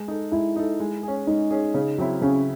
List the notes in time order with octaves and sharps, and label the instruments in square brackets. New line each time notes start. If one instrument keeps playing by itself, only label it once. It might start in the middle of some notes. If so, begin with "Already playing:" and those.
Already playing: [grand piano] G#3
D#4 A4
[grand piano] G#3 [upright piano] E4
[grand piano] D#4 A4
G#3
C#4 G#4
[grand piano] G#3 [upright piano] D#4
[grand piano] C#4 G#4
C#3
F#3 C4 E4
[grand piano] C#3 [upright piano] C#4